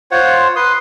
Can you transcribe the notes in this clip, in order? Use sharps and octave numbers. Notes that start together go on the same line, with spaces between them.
F4 C5 C#5 F#5
B4 C6 D#6